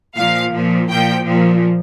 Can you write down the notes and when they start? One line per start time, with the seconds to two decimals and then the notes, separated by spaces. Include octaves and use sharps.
0.15 A#2 F3 F5
0.53 A#2 F3
0.89 A#2 F3 G5
1.26 A#2 F3